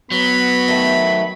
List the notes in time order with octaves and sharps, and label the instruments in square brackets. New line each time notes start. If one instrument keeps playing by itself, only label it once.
[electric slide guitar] F#3 [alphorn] B3 [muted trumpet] B5
[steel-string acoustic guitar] D#3 A3